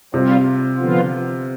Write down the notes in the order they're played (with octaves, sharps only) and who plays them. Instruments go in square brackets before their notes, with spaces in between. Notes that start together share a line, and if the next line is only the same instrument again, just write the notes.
[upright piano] C3 [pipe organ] G3 C4 F4
[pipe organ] D3 F3 B3 F4